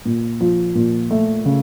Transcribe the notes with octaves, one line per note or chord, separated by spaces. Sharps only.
A#2
F3
A#2
A3
C#3